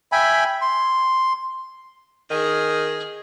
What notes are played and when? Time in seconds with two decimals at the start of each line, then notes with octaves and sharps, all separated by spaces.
0.12 E5 G5 G#5 B5
0.61 C6
2.30 D#3 G#4